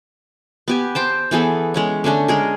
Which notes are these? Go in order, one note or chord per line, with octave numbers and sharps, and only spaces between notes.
B3 G4 G#5
C5 G5 A5
E3 B3 G#4 A4
G#3 C#4 C#5
D3 A3 C#4 D4
G#3 G#4 A#4